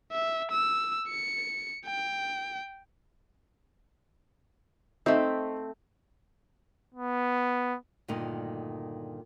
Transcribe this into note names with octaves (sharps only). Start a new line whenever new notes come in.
E5
E6
C#7
G5
A3 C4 D#4 E5
B3
D2 G2 A#2 D#3 D#4